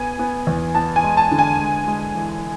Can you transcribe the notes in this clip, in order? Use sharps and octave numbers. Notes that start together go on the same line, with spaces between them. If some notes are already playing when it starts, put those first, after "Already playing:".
Already playing: B3 G#5
B3
E2
B3 A5
G#5
G#3
A5
D3
G#5
G#3
G#3
E3